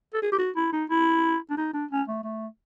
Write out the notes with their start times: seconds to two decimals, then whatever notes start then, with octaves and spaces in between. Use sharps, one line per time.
0.14 A4
0.22 G#4
0.32 G4
0.38 F#4
0.56 E4
0.73 D#4
0.90 E4
1.50 D4
1.57 D#4
1.73 D4
1.91 C#4
2.08 A3
2.24 A3